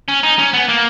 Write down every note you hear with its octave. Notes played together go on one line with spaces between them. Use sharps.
C#4
D#4
C#4
B3
A#3